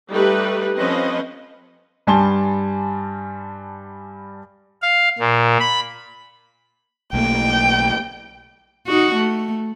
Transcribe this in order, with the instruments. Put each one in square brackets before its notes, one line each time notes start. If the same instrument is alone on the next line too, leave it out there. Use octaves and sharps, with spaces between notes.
[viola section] G3 A3 D#4 G4 B4
F3 C4 C#4 B4 D#5
[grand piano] G2 G3 G#5 A5 C6 G7
[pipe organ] F5
A#2
B5
[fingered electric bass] B1 A3 A#3 [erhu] G5
[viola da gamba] D#4 F#4
A3